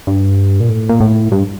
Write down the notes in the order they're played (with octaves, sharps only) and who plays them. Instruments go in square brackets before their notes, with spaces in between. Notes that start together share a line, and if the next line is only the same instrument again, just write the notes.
[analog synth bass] G2
A#2
A2
A#2
A2
G2